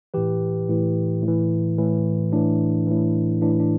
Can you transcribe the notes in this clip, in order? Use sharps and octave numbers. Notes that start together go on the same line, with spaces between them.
A2 E3 G4 B4
A2 E3
A2 E3
A2 E3
A2 E3 D4
A2 E3
A2 E3 D4
D4